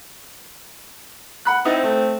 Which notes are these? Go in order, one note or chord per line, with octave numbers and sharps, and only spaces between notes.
F#5 B5 F#6
C4 D#4 E4 D#5
A3